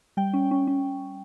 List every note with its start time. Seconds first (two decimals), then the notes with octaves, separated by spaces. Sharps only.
0.17 G3 G5
0.34 C#4
0.51 C#4
0.67 C#4